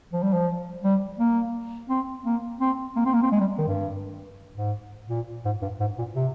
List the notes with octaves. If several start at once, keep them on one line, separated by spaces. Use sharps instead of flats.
F3
G3
F3
G3
A#3
C4
A#3
C4
A#3
C4
A#3
C4
G#3
G3
D#3
G2
G#2
A#2
G#2
G2
G#2
A#2
C3